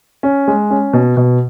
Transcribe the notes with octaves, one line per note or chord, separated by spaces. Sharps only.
C#4
G#3
C#4
B2
B2